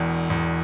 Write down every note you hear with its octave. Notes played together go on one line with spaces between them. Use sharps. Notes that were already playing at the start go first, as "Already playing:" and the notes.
Already playing: E1 E2
E2